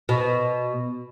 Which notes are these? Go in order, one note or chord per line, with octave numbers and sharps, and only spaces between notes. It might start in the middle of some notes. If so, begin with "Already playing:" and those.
B2